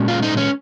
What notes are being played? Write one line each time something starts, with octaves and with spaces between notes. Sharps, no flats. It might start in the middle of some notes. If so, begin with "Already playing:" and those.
Already playing: A#2 G#3 C#4
F4
D#4
C#4